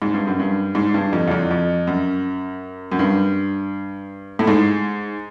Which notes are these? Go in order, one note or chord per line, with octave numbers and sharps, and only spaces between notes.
G#2
G2
F#2
G2
G#2
G2
F2
E2
F2
F2
F#2
F#2
G2
A2
G#2